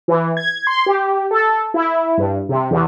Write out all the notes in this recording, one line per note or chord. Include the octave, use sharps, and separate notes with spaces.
E3
G#6
C6
G4
A4
E4
G2
C3
E2